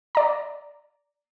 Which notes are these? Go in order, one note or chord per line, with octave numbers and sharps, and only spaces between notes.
D5 A#5